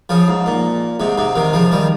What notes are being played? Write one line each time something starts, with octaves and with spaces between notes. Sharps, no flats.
C#3 F3
G#2
A#2
G#2 C3
G#2 C3
C3 D#3
C#3 F3
D#3 G3